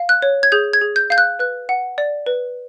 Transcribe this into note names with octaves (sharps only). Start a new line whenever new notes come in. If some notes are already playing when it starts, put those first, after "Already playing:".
Already playing: F5
F#6
C#5
G#6
G#4 G6
G#6
G#4
G6
F5 G6
F#6
B4 F#6
F#5
D5
B4